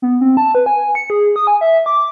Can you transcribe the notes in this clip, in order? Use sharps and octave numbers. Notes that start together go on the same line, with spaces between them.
B3
C4
A5
B4
G#5
C#7
G#4
D#6
G#5
E5
D6